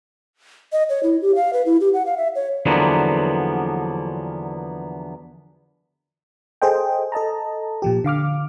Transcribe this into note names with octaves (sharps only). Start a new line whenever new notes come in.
D#5
C#5
E4
G4
F5
B4
E4
G4
F#5
F5
E5
C#5
E2 D3 F3 F#3 A#3 B3
G#4 A4 C5 D#5 G5
A4 D#5 A5 A#5
A#2 F3 G4
D3 F5 D6 F6